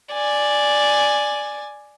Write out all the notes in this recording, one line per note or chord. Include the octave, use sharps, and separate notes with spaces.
D5 G#5